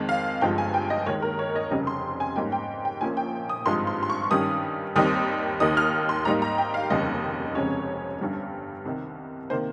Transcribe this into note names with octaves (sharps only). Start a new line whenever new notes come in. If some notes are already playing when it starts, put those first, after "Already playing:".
Already playing: F2 D#3 G#3
F5
G1 G2 F3 G#3 G5
G#5
G5
D#5
D#2 D#3 G#3 C#5
A#4
C#5
D#5
F1 F2 C#3 G3 C#4 D#5
C6
G#5
G#2 G3 A#3 C#4 G5
G5
G5
A#1 A#2 F3 A#3 C#4 G#5
G5
D#6
G#1 G2 F3 G#3 C6
C6
C6
C#6
G2 D#3 G3 C#4 D#6
D#2 D#3 G3 C4 D#4 D#6
D#2 D#3 A#3 D#4 D#6
F6
C6
G#2 G3 A#3 D#4 A#5
A#5
G5
F5
F1 D#2 C#3 G3 D#5
F1 F2 C#3 G#3 C#4 C#5
G1 G2 G3 C#4
C2 C3 D#3
C3 D#3 A#3 C5